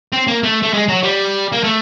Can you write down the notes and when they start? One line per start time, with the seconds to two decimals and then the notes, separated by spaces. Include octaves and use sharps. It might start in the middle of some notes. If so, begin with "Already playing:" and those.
0.13 C4
0.27 A#3
0.43 A3
0.62 A3
0.74 G#3
0.89 F#3
1.03 G3
1.52 A#3
1.64 A3